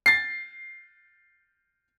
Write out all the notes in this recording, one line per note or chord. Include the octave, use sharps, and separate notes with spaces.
A6 C7